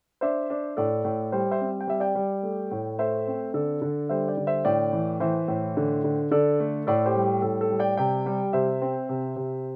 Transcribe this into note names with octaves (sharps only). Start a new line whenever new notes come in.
D4 C5 E5
D4
A2 A4 D5
A2
G3 G4 C5
C5 E5
C4
G5
G3 E5
D5 G5
G3
A3
A2
A3 C5 E5
C4
D3 A4 D5
D3
G3 C5 E5
D5 G5
D3
C5 E5
A2 D5 G5
E3
E3 C5 E5
A2
D3
D3
D3 A4 D5
A3
A2 A4 D5
G4 C5
G3
G4
A2 A4
A4
G3
D5 G5
C3 D5 G5
G3
C3 C5 E5
C4
C3
C3